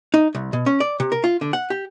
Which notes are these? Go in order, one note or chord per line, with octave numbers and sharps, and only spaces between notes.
D#4
C2
B2
C#4
D5
C3
A#4
F4
D3
F#5
G4